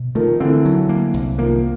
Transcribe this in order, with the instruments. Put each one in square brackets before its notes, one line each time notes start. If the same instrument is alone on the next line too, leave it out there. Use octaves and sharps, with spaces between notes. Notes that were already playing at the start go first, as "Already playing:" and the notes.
Already playing: [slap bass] B2
[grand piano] D#3 F3 [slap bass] A3
[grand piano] D3 E3 [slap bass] C4
[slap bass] F#3
A#3
C2
[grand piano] D#3 F3 [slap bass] A#3